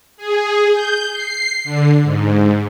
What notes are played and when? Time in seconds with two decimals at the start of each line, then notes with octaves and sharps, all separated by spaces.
0.17 G#4
0.72 G6
1.12 C7
1.64 D3
2.04 G#2